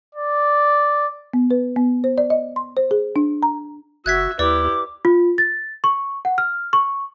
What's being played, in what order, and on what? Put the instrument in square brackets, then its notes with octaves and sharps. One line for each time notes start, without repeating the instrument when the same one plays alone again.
[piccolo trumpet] D5
[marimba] B3
B4
B3
C5
D5
D#5
C6
C5
G#4
D4
A#5
[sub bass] F#1 [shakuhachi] F#4 [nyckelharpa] E5 [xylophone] F#6 G#6 B6
[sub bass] D#2 [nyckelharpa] E4 G4 [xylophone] B4 D5 [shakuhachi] D6
[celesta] F4
A6
C#6
F#5
F6
C#6